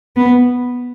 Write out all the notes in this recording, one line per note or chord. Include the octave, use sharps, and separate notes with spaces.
B3